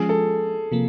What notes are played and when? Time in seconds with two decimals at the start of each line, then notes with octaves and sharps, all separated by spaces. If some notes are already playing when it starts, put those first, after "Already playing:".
Already playing: F3 G#3 C#4 F4 G#4
0.09 A4
0.72 C3 F3 A#3